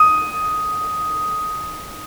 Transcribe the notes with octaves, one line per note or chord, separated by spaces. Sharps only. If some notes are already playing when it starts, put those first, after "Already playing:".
Already playing: D#6